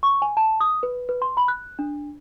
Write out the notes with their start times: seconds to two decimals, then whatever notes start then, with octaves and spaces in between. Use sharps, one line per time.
0.03 C#6
0.22 G#5
0.37 A5
0.61 D#6
0.83 B4
1.09 B4
1.22 C6
1.37 B5
1.48 F#6
1.79 D4